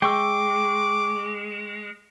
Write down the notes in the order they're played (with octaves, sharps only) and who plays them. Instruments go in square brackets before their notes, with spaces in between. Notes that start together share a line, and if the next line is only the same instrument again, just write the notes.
[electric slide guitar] G#3 [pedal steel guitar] G5 C#6 E6 [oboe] D6